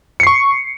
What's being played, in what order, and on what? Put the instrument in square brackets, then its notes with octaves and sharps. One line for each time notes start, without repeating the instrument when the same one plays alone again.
[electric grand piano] C#7
C7
C#6